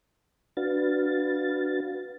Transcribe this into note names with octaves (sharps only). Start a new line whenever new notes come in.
D4 F#4 B4 F5 A6